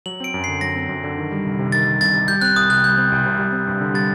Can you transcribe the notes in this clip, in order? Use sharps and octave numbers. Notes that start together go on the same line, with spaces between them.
F#3 F#7
C4 D7
F#2
D3 C7
F#3 A#6
C4
F#2
D3
D#3
G3
C2
C3
D#3 A6
G3
C2 A6
C3
G3 G6
C4 F#6
C2 D#6
C3 F#6
G3 G6
C4
C2
C3
G3
C4
G2
D3
G3 A6